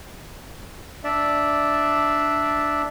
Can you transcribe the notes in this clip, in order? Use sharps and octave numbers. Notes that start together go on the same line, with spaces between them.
D4 D5 E5